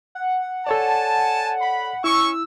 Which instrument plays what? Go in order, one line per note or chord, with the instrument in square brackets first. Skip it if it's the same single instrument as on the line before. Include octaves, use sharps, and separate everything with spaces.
[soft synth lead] F#5
[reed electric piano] A4 C#5 D5 [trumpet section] G#5 A5
[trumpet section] B5
[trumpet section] C#4 C#6 [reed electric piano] E4 [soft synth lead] E6